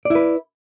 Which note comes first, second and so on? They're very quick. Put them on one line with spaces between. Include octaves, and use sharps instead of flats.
D5 E4 B4